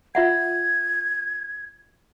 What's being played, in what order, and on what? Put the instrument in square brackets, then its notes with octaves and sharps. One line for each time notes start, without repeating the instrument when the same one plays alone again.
[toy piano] F4 E5 F#5 [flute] G#6